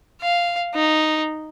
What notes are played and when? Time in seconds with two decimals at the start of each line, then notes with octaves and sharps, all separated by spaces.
0.22 F5
0.75 D#4